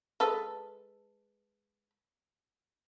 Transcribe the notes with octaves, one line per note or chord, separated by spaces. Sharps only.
G#3 A4 B4